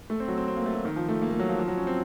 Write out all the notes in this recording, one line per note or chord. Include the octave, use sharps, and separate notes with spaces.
A3
C4
F#3
C4
C4
A#3
A3
F#3
D#3
F3
A3
A#3
A3
F#3
F3
F3
F#3
C#4
C4